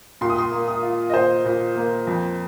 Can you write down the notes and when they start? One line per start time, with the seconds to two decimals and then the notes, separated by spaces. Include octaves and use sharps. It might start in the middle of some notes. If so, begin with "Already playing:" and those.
0.21 A#2 C6
0.30 D#6
0.38 C6
0.52 A#3
0.68 D#6
0.83 F4
1.10 D#5
1.14 A#2 C5
1.45 A#2
1.76 A#3
2.07 F2